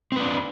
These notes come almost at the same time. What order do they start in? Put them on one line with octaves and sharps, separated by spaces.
C4 B4 D4